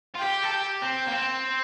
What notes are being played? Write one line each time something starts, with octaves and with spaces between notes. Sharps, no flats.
F4
G4 G5
A4
G4
C4 G5
A#3
C4